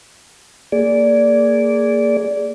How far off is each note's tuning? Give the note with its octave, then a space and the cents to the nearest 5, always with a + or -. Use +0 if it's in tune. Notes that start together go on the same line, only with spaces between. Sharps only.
A#3 -15 G#4 +0 D5 -15